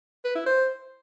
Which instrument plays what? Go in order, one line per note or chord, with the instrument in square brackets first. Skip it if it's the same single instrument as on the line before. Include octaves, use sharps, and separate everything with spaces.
[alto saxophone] B4
E4
C5